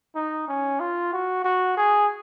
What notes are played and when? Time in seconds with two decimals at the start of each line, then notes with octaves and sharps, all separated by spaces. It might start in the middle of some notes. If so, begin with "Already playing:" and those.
0.15 D#4
0.48 C#4
0.80 F4
1.13 F#4
1.44 F#4
1.77 G#4